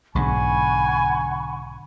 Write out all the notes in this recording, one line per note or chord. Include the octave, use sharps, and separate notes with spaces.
B1 G#2 D3 D4 F#5 G#5 B5 C#6